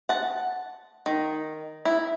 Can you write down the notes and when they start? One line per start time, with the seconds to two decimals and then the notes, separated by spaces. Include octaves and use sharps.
0.09 F#5 A5
1.06 D#3
1.85 E4